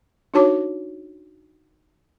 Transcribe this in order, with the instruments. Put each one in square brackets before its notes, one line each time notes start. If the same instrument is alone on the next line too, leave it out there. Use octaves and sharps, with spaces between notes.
[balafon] D4 D#4 F#4 C#5 A5 D6